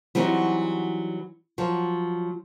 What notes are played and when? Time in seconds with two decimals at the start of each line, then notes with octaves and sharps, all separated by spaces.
0.15 E3 F#3 G3 C4 D#4 F#4
1.58 F3 F#3